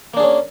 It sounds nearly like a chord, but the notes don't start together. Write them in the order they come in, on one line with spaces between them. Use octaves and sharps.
A#3 D4 G#4 C#4